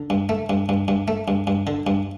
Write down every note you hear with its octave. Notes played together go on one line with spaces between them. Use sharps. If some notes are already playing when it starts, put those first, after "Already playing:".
Already playing: D3
G2
A3
G2
G2
G2
A3
G2
G2
D3
G2